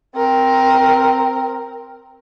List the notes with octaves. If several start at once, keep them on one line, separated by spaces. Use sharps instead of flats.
C4 A#4